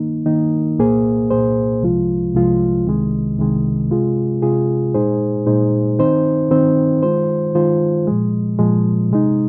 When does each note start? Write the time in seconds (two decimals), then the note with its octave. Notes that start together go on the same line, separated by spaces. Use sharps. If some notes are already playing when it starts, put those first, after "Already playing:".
Already playing: D#3 A#3 D#4
0.26 D#3 A#3 D#4
0.78 C2 A#2 A#3 G#4 C5
1.30 C2 A#2 A#3 G#4 C5
1.82 C2 C3 F3 G#3 F4
2.34 C2 C3 F3 G#3 F4
2.86 C2 C3 D#3 G#3
3.38 C2 C3 D#3 G#3
3.90 C3 G#3 F4 G#4
4.42 C3 G#3 F4 G#4
4.94 A#2 G#3 D#4 G#4 C5
5.47 A#2 G#3 D#4 G#4 C5
5.99 D#3 C4 D#4 C5
6.51 D#3 C4 D#4 C5
7.03 D#3 G#3 F4 C5
7.55 D#3 G#3 F4 C5
8.07 A#2 F3 G#3
8.59 A#2 F3 G#3
9.11 C3 G#3 D#4